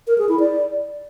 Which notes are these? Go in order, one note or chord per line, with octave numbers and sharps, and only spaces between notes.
A#4
G#4
E4
D5